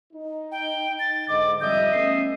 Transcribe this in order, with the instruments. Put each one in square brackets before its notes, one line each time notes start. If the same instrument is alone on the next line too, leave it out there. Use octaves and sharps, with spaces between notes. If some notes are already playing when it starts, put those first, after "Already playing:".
[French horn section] D#4
[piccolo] G5
A6
[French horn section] G#2 D3 D#5 [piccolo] D6
[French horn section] F2 G#2 G3 [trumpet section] D#5 E5 D#6 [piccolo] G6
[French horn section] A3 B3 C#4 [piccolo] C7